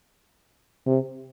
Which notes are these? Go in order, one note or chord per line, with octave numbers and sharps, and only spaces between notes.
C3